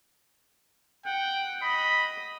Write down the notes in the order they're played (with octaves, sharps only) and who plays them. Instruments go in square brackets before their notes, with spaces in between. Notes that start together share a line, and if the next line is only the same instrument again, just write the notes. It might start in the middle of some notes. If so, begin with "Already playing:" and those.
[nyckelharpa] F#5 [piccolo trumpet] G5
[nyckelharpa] D#5 [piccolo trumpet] B5